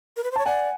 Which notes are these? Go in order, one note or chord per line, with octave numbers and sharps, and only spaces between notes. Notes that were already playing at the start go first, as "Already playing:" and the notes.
A#4
B4
C5
C#5 A5
D5 F#5 G#5